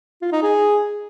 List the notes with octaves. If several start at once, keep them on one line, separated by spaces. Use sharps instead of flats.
F4
D#4
G#4